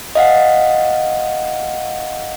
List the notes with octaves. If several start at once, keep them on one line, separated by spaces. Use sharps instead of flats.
D#5 F5 F#5